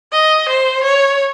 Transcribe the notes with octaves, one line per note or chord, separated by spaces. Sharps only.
D#5
C5
C#5